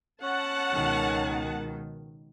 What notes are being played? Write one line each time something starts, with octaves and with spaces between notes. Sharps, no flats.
C#4 F#5 A5
C#2 B2 D#3